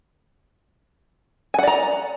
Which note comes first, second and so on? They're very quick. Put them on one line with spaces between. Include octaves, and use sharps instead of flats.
G#5 F#5 D5 A#5